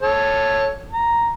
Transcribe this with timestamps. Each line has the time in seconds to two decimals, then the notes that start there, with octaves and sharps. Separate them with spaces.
0.02 A4 C#5
0.92 A#5